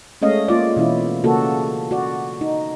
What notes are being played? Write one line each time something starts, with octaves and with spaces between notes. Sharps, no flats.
G#3 A3 C#4 D#5 F5
A#3 F4 D5
B2 E3 C#4 E4
C#3 A#3 F#4 A4
F#4 D5
D#4